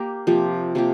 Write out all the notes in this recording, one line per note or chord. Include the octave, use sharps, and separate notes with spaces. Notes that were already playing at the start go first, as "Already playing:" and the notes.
Already playing: A#3 G4 A#4
C3 F3 A#3 G4
C3 F3 A#3 G4